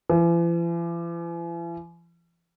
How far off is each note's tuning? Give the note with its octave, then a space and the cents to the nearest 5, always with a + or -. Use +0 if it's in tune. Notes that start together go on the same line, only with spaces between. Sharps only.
E3 +45